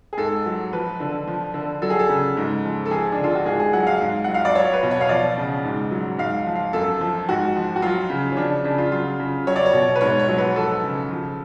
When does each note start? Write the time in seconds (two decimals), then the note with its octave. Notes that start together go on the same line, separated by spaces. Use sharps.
0.13 G#4
0.17 G#2 A4
0.46 F#3
0.73 F3 B4
1.00 D3
1.27 F3
1.54 D3
1.82 F#3 A4
1.90 G#4
1.99 A4
2.09 C#3
2.37 G#2
2.64 F3
2.85 A4
2.91 F3 G#4
3.12 D4
3.18 D3
3.24 F4
3.35 F#4
3.46 G#2 G#4
3.60 G#4
3.73 F#3 F#5
3.87 F5
4.01 G#2
4.24 F#3 F#5
4.34 F5
4.45 D5
4.55 F#3 C#5
4.73 B4
4.83 B2
4.91 C#5
5.01 F5
5.09 F3 D5
5.38 C#3
5.64 G#2
5.91 F#3
6.19 G#2 F5
6.46 F3
6.55 F5
6.73 F#2 A4
7.01 F3
7.29 G#2 F#4
7.56 F3
7.76 F#4
7.82 F#3 F4
8.10 C#3
8.32 C#4
8.37 F3 D4
8.64 C#3 D4
8.78 F4
8.91 F#3 F4
9.20 C#3
9.47 F#3 C#5
9.56 D5
9.66 C#5
9.73 B2
9.96 B4
10.01 G#2 C#5
10.19 C#5
10.29 F#3
10.38 B4
10.56 F3 A4
10.84 C#3
11.11 F3